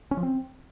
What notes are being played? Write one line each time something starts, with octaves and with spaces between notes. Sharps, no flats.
C#4
F3
C4